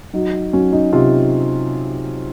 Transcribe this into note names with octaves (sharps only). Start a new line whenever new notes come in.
F#3 D#4
F#3 C#4
D#4
C3 F4